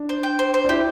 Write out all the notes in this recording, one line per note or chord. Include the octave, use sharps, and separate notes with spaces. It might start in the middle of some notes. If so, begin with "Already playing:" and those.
Already playing: D4
C5
G5
C5
C5
D4
E4 G4